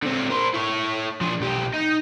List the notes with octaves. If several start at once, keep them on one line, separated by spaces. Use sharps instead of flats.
D3 C4
A#4 C5
E4 C#5
F3 D4
B1 G4
D#4